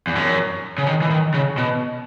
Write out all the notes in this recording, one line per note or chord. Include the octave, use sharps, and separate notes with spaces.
E2
F#2
C#3
D#3
E3
D#3
C#3
B2